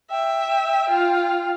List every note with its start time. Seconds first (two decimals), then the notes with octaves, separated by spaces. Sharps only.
0.11 E5 G5
0.90 F4